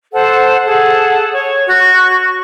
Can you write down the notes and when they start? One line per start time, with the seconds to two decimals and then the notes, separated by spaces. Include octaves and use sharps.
0.12 A4 C5 F#5
0.66 G#4 A4 F#5
1.32 C#5
1.67 F#4 C#6